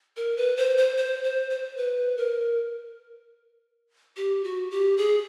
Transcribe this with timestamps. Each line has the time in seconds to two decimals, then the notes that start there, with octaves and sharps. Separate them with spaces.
0.17 A#4
0.37 B4
0.57 C5
0.77 C5
0.97 C5
1.24 C5
1.50 C5
1.77 B4
2.17 A#4
4.17 G4
4.44 F#4
4.71 G4
4.97 G#4